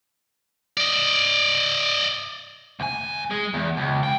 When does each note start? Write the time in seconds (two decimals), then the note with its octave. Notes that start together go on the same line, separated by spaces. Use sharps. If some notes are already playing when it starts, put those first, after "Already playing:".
0.77 D5 D#5
2.80 D2 G#5
3.31 G#3
3.54 E2
3.77 C#2
4.03 C#3 G5